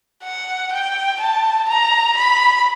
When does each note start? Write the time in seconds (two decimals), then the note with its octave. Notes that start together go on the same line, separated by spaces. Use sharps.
0.24 F#5
0.72 G5
1.21 A5
1.69 A#5
2.17 B5